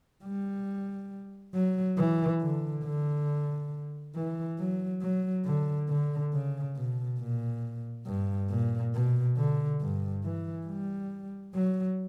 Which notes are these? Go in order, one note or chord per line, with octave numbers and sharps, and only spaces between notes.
G3
F#3
E3
D3
D3
E3
F#3
F#3
D3
D3
C#3
B2
A#2
G2
A#2
B2
D3
G2
E3
G3
F#3